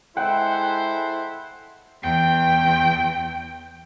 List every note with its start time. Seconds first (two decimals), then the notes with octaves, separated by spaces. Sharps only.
0.17 G#3 E4 A4 C5 E5 F#5 G5
2.03 E2 G5